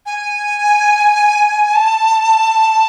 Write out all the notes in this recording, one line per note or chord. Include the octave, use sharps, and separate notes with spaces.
G#5
A5